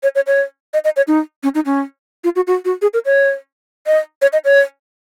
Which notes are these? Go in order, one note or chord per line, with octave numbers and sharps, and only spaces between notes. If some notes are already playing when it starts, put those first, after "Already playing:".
C#5
C#5
C#5
D#5
D#5
C#5
D#4
C#4
D#4
C#4
F4
F#4
F#4
F#4
G#4
A#4
C#5
D#5
C#5
D#5
C#5